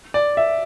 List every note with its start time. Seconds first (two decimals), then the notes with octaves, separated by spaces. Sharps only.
0.14 D5
0.37 E5